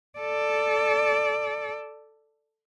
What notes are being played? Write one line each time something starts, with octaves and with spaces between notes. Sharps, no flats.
A4 D5